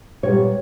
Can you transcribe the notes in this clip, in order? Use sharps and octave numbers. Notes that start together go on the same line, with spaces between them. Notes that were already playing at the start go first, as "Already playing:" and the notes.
A#2 G3 B3 C#5